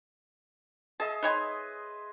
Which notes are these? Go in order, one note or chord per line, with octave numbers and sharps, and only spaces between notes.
G#4 D#5 E5 A5
D#4 B4 C#5 G#5 C6